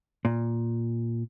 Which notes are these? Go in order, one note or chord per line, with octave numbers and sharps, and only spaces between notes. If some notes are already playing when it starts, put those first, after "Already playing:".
A#2